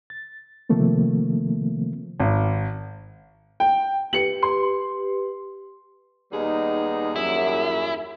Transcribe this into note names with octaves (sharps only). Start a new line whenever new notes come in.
A6
C3 D#3 F3 A3 A#3 C4
G#1
G5
G4 B4 C#7 F#7
C6
D#2 G3 B3 D#4 G#4
F#2 E4